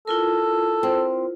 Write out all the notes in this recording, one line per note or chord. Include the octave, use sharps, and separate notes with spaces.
E4 F4 A4 A#4
C4